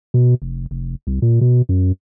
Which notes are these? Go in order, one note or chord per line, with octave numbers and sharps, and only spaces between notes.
B2
F1
F1
C2
A#2
B2
F#2